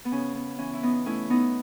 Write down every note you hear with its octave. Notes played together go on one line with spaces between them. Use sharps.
B3
C#3 C#4
B3
E3 C#4
E4
B3 D#4
A3 C#4 E4
B3 D#4